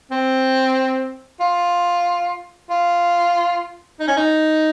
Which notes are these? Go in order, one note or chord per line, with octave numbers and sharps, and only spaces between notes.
C4
F4
F4
D#4
C#4
D#4